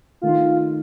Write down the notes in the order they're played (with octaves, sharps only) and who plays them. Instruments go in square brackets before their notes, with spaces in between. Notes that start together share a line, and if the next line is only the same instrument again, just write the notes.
[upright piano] D#3 A3 D#4 [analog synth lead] F4